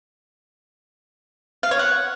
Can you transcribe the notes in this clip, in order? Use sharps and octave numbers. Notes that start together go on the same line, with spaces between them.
F5
C#5
F#5